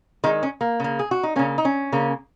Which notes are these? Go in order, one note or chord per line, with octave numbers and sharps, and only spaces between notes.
D#3 G#3 A#3 D#4
C#4
A#3
C#3 A#3
G#4
F#4
D#4
C#3 A#3 C#4
D#4
C#4
C#3 A#3